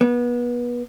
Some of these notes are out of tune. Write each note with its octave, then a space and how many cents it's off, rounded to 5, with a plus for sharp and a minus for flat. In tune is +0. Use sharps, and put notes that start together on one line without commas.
B3 -30